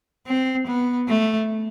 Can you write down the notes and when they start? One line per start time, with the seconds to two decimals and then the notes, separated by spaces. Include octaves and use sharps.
0.27 C4
0.67 B3
1.08 A3